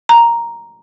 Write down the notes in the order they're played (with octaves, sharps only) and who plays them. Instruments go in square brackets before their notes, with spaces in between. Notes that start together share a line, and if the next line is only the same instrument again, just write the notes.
[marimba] A#5